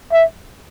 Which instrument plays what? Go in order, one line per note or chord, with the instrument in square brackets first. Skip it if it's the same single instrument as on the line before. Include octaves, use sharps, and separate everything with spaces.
[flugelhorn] E5